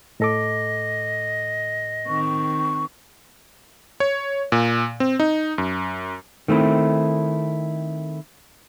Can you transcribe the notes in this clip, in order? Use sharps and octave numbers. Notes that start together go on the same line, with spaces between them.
A2 A4 D#5 D6
D#3 C4 C#6
C#5
A#2
C4
D#4
F#2
D#3 A3 C4 E4